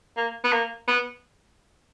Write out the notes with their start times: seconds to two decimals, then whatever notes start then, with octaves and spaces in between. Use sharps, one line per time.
0.17 A#3
0.44 B3
0.53 A#3
0.88 B3